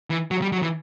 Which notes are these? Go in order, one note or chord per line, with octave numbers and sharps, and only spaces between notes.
E3
F#3
G3
F#3
E3